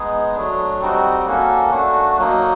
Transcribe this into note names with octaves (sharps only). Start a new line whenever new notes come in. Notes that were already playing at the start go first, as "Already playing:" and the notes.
Already playing: G#3 B3 D#4 G#4
F#3 A3 D4
G3 C4 D#4 F#4
A#3 C#4 F#4 A4
A3 D4 F#4
F#3 A#3 D#4